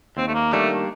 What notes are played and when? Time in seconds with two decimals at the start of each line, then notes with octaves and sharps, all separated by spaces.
0.17 D#2 C4
0.28 A3
0.34 A#3
0.53 D#3 G3 A3 A#3 D4